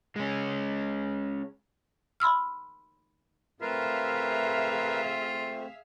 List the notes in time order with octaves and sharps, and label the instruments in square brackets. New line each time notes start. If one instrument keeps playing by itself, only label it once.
[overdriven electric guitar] G#3 C#4
[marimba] B5 C6 E6 F6
[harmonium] A3 C4 [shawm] F4 [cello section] G#4 E5 F5 [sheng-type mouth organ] A#4 B4